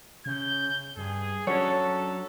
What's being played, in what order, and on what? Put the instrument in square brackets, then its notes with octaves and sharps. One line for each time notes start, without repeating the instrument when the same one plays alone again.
[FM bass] C#3 [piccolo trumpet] G6
[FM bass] G2 [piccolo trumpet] G#4
[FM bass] F#3 [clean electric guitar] C#4 D4 F#4 [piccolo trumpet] A4 [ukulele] C#5